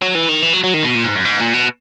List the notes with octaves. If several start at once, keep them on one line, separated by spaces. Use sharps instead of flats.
F#3
E3
D#3
E3
F#3
F#3
D#3
B2
A#2
G#2
F#2
G#2
A#2
B2